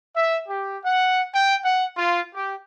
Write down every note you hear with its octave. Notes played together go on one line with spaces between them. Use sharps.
E5
G4
F#5
G5
F#5
F4
G4